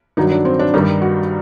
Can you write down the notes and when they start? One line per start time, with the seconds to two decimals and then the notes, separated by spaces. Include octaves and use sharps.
0.17 G2 D#3 F#3 D#4
0.32 D4
0.45 C4
0.59 D4
0.74 G2 D#3 G3 D#4
1.02 F#4